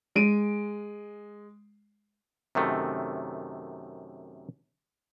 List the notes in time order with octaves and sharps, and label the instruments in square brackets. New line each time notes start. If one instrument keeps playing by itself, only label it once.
[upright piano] G#3 D7 D#7
[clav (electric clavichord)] F#2 C3 D#3 A3